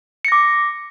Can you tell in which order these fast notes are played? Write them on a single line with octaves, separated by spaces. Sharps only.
C#7 A#6 D6